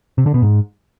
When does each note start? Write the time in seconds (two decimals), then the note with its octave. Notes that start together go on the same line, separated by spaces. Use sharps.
0.18 C3
0.26 D3
0.34 B2
0.42 G#2